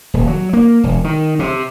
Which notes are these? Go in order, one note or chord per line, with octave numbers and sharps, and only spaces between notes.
D#1
F#3
A#3
E1
D#3
C3